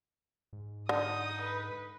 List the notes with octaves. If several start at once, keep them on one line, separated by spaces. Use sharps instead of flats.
G#2
D3 D#4 D#6
B4